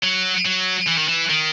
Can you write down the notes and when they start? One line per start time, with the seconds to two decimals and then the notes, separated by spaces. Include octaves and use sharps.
0.03 F#3
0.45 F#3
0.87 E3
0.97 D#3
1.08 E3
1.30 D#3